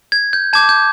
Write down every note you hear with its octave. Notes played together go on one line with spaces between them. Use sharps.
G#6
G6
A5 D6 G6 G#6
G6